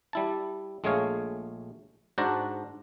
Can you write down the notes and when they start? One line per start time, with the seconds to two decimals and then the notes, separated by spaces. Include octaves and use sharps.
0.13 G3 E4 A5
0.84 A#1 G#3 A3 G#4 C#5 F5
2.18 G#2 D4 F#4 C5 A5 A#5